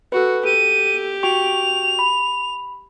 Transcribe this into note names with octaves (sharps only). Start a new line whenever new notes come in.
F#4 A4 B4
G4 A4 D#7
F#4 G5 C#6 F7
B5